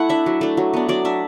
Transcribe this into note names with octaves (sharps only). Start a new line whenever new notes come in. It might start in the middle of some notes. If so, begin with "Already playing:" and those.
Already playing: A3 E4 F#5
D4 E5
F#3
A3 D4
F#3
B3 D4
F#3 D5
D4 E5